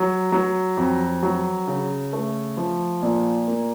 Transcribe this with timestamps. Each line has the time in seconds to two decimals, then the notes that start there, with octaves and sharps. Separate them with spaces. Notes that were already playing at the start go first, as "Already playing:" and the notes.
Already playing: F#3
0.32 F#3
0.77 F2
1.23 F#3
1.67 C#3
2.13 A3
2.57 F3
3.03 A#2
3.48 A#3